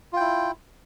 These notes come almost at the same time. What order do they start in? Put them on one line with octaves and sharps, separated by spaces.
F4 G5 E4